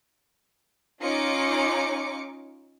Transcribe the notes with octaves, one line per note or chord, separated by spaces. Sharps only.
C#4 D#4 F4 D6 C#7